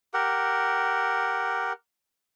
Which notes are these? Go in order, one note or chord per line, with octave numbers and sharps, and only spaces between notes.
G4 A#4 F#5